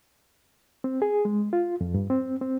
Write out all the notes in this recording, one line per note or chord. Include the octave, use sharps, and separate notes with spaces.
C4
G#4
G#3
F4
F2
G2
C4
C4